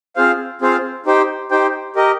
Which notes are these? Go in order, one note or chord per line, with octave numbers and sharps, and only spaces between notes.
C4 F4 G#4 C5 F5
C4 F4 G#4 C5 F5
D#4 G4 C5 G5
D#4 G4 C5 G5
G4 A#4 D#5